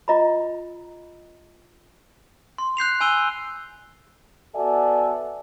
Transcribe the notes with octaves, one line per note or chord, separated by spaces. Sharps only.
F4 D#5 A#5 B5
C6
F#6 G6 C7 F7
G#5 B5 E6 D#7 G7
B3 F#4 A4 D5 E5 G#5